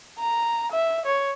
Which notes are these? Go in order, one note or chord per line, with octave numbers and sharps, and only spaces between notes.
A#5
E5
C#5